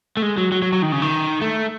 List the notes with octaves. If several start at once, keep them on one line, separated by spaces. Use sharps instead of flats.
A3
G#3
F#3
F#3
F#3
F#3
D#3
C#3
D#3
A3